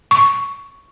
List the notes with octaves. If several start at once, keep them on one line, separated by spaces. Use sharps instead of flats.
C#6